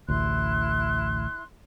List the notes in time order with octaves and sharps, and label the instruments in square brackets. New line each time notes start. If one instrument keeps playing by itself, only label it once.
[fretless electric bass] A1 D2 [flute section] E4 C6 F#6